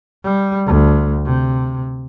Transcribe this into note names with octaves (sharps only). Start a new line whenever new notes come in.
G3
D2
C3